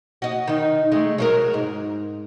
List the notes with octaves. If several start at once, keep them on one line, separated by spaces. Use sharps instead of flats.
F#4 D#5
D#3 D#4
G#3 A3 D#4
F#3 G#3 A#4
G#2